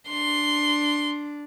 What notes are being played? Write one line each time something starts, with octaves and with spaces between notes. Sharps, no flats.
D4 C6